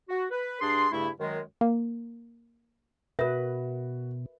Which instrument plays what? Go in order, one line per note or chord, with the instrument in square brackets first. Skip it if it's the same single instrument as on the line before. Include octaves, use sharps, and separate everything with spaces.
[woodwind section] F#4
B4
G2 D4 G#4 C6
G2 C#3 A3 E4
F#2 D#3 F#3 G#3
[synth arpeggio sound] A#3
[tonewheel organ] B2 [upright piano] F#4 [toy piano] A#4 E5 [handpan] B4